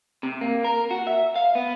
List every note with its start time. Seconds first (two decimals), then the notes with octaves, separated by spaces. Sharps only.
0.23 C3
0.41 A#3
0.65 A#4
0.91 F#4
1.07 E5
1.36 F5
1.55 B3